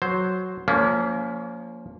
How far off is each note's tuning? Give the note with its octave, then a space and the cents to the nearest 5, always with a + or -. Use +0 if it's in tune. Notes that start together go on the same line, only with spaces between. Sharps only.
F#3 +0 C5 +0
F3 +15 A#3 -15 C#4 +30